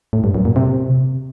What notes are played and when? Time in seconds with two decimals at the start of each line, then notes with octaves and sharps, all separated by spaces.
0.13 A2
0.24 G2
0.34 F#2
0.45 A#2
0.56 C3